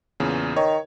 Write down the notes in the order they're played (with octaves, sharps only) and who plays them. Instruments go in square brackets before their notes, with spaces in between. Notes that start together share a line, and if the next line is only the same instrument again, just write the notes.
[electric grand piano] E2 A#2 C#3
[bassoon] D#3 [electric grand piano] C#5